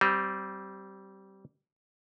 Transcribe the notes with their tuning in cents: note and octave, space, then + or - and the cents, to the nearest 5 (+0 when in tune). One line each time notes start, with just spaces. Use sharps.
G3 -20 C4 +0